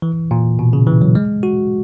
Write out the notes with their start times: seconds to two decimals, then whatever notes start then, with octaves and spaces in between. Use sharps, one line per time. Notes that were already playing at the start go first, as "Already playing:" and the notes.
0.02 E3
0.31 A#2
0.59 B2
0.73 C#3
0.87 E3
1.02 F#3
1.15 G#3
1.43 F#4